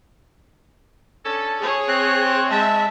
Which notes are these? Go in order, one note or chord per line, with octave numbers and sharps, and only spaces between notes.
C#4 D4 A4
G#4 C#5
C4 F#6
G#3 E5 A5